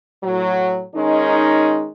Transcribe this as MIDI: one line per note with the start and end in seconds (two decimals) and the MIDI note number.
0.23 0.83 45
0.23 0.83 54
0.94 1.90 51
0.94 1.90 56
0.94 1.90 61
0.94 1.90 63